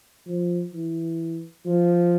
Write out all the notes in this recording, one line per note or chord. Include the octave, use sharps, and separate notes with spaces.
F3
E3
F3